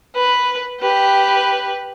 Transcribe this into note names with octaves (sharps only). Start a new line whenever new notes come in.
B4
G4 B4